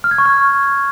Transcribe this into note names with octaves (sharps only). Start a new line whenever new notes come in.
F6
G#6
C#6
F6